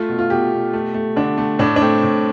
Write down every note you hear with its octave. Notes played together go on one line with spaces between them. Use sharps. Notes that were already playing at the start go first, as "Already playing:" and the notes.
Already playing: A3 F4
B2
F4
B2 G4
B2
A3
A3
D3 D4
A3
A2 D4
D4
A3 C4
A2